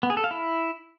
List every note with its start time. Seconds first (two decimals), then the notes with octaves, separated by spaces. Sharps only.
0.03 B3
0.10 G#4
0.17 A4
0.24 F5
0.31 E4